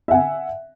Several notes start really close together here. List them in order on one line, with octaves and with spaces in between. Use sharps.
E5 F#5 G#5